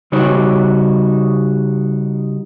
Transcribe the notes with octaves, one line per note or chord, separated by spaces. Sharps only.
C#3 G3 D#4 F#4 C#5